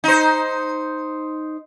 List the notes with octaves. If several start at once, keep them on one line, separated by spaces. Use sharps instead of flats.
D#4 C5